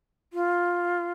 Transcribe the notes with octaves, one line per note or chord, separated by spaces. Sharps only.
F4